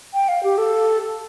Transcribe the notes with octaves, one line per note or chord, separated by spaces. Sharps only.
G5
F5
G4
A4